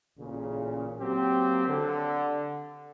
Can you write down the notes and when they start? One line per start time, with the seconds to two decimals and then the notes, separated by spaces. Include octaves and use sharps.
0.19 A1 A#2 C#3
0.99 F#3 A#3 C4 G4
1.68 D3